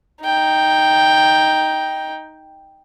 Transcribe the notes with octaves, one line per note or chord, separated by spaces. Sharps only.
D#4 G5